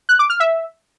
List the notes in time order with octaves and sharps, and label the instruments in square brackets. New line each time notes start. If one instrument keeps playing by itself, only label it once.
[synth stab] F#6
D6
F6
E5